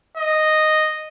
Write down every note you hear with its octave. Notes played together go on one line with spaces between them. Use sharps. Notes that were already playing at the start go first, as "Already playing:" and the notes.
D#5